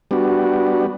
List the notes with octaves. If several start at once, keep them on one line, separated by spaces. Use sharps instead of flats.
G3 B3 D4 F#4